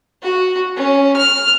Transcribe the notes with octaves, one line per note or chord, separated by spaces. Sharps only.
F#4
C#4
F6